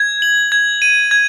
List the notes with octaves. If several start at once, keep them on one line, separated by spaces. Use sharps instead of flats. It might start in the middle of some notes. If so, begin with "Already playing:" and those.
Already playing: G#6
F#7
G#6
D#7
G#6